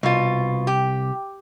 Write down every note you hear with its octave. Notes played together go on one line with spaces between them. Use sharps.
C2 B2 F4
G4